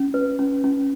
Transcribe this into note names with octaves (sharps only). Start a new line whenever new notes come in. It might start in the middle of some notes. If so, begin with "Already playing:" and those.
Already playing: C#4
B4
C#4
C#4